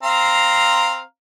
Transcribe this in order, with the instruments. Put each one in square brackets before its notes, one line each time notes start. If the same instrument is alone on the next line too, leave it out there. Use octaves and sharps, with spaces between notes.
[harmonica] C4 F5 A#5